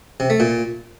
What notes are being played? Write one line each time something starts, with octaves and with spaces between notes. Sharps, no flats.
C3
A3
A#2